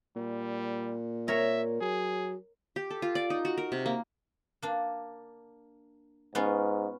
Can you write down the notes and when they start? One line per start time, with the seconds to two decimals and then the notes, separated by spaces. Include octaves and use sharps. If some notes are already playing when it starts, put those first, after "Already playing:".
0.16 A#2 G3
1.28 A#4 C#5 E5
1.81 F#3 G#4
2.76 G4
2.90 A4
3.02 F4
3.15 D5
3.30 D#4
3.45 F#4
3.58 A#4
3.72 C3
3.86 A#3
4.62 A#3 D4
6.35 G#2 B3 C#4 F4